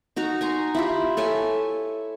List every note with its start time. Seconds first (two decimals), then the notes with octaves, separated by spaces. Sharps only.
0.16 D#4 F#4 A#5
0.41 G#5 A#5 C6 C#6
0.75 E4 F4 G4
1.17 A4 C#5 E5 G#5